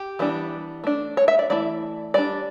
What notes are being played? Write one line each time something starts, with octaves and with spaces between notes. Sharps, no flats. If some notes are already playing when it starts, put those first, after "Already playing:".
Already playing: G4
E3 G3 B3 D4
A3 D4
C#5
E5
D5
E3 A3 E4 D5
G3 D4 D5